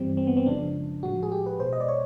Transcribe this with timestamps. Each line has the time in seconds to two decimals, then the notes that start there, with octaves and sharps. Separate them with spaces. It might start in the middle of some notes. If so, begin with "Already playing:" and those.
Already playing: G2 E3 G3 C4
0.17 C4
0.27 B3
0.37 C4
0.46 F#2 C#3 F3 G#3 D4
1.03 A2 F3 G#3 F#4
1.23 G#4
1.32 G4
1.46 B4
1.60 B2 G#3 C5
1.73 D#5
1.80 D5
1.88 C#5